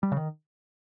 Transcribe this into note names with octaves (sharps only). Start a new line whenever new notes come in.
G3
C#3
D#3